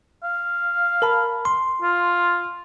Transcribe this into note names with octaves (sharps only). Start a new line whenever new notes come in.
F5
A#4 A5 B5
C6
F4